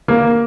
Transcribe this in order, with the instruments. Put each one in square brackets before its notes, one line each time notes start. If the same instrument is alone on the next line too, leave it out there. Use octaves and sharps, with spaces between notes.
[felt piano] A#3